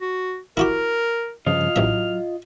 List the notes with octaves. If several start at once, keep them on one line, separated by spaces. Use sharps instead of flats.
F#4
E4 F#4 G4 A#4
G2 C#3 F3 F4 D#5 F6
A1 F#3 E5